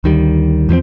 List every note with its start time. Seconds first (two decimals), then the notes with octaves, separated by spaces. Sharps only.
0.04 D2 D#3 G3
0.69 E2 F3 A#3 C4